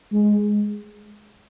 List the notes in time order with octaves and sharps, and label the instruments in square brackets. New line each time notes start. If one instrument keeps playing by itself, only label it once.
[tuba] G#3